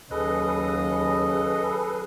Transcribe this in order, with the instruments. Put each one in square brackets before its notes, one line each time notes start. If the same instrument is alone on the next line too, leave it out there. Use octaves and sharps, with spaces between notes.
[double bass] D#2 F#3 [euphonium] C#3 [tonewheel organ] G#4 A4 B4 [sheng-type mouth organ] D#5